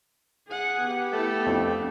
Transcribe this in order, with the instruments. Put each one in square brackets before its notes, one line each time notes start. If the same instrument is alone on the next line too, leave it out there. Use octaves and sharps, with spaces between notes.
[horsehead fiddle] G#4 F#5
[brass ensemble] B3 G4
[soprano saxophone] A3 [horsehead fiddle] E4 A4
[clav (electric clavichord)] F2 [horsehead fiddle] D4